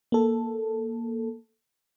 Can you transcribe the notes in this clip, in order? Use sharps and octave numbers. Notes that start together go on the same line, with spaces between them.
A#3 A4